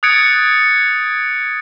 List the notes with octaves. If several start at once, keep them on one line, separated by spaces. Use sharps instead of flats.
D#6 F#6 G#6 A6 C#7 D7